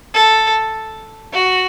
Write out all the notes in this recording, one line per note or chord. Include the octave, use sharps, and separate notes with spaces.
A4
F#4